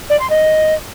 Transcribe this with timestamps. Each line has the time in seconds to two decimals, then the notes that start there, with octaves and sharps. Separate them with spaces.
0.09 D5
0.19 C6
0.29 D#5